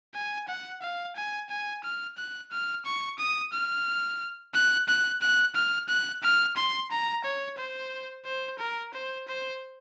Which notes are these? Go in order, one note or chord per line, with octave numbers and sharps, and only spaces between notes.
G#5
F#5
F5
G#5
G#5
F6
F#6
F6
C#6
D#6
F6
F#6
F#6
F#6
F6
F#6
F6
C6
A#5
C#5
C5
C5
A#4
C5
C5